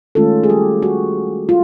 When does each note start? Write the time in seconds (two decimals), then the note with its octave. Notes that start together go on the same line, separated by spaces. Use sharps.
0.15 D#3 G#3 A3 C#4 F4 A4
0.44 G#4
0.49 G3 G4
0.82 F#4
1.49 F4